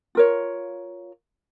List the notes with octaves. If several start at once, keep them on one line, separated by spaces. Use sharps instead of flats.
F4 A#4 C#5